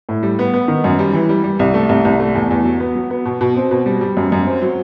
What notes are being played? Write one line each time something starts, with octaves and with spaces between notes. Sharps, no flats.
A2
G3
B3
B3
D#3
F#2
G3
E3
G3
G3
C2
A3
C2
C2
A3
E2
E2
F#3
B3
F#3
B3
B2
B2
C4
B2
G3
G3
F#2
F#2
C4
F#3